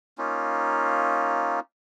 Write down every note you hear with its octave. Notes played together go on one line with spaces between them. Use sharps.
A#3 C#4 D#4 F4